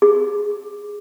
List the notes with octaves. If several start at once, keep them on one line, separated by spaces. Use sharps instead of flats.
G#4